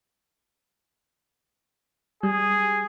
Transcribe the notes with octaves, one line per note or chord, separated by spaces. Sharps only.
G3 G#4